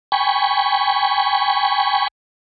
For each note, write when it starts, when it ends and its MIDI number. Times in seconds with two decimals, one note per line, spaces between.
0.12 2.08 79
0.12 2.08 80
0.12 2.08 83
0.12 2.08 85